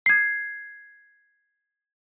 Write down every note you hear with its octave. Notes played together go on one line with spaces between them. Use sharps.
G#6 C7